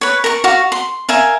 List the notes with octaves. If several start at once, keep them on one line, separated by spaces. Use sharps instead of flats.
B4 C#5
A#4 C#6
F#4 F5 C#6
C6
A#4 E5 F5 G#5